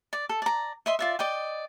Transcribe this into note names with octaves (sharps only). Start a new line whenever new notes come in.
D5
A4
D5 A#5
D#5 E5 C6
F4 D5 E5
D5 D#5 G5